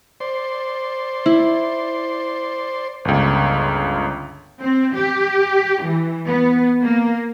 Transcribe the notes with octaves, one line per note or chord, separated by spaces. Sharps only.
C5 D5 C6
E4
G1 C#2
C4
G4
E3
B3
A#3